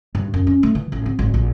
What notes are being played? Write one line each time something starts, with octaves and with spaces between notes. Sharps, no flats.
G2
F#2
C#4
A3
E3
A1
C4
G#1
A#1